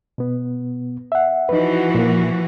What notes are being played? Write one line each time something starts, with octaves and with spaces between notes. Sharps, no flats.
B2 B3
E5 F#5
E3 F3 D#4 F#4 B4
A#2 A#3